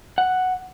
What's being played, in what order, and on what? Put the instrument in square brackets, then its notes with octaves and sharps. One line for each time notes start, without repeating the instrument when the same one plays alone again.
[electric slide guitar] F#5